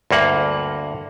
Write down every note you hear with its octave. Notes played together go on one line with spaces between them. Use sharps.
D2 G2 A#3 F#5